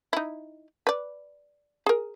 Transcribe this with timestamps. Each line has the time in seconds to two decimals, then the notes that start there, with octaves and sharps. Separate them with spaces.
0.13 D#4 E4
0.87 B4 D5
1.86 G#4 A#4